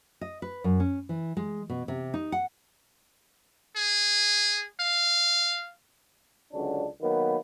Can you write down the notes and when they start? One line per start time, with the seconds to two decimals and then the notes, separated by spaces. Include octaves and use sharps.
0.21 D#5
0.42 B4
0.64 F#2
0.80 C#4
1.09 E3
1.37 G#3
1.69 B2
1.88 C3
2.14 D#4
2.32 F#5
3.76 G#4
4.81 F5
6.53 C#2 D3 F#3 C#4 D4
7.01 D#3 F#3 A#3 B3 B4